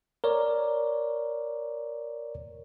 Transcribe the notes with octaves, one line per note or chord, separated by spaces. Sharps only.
A#4 C#5 D5